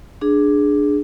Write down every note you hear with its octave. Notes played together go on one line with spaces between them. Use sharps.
D4 G#4